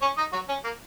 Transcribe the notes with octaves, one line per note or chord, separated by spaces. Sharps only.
C#4 C#5
D#4 D#5
F#3 F#4
C#4
A#3